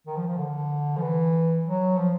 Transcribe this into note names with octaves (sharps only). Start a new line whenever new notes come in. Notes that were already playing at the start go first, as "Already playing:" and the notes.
D#3
F3
F3
D3
F3
E3
F#3
F3